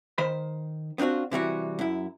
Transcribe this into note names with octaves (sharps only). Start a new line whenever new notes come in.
D#3 C5 B5
B3 C4 D4 F4 F#4
C3 E3 G3 F#4
F#2 E4